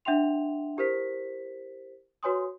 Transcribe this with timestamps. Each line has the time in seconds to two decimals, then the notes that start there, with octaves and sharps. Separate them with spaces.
0.05 D4 E5 F#5 G5 C6 F7
0.77 E4 G4 A#4 C5 B6
2.23 F#4 B4 C#5 G#5 C6 D#6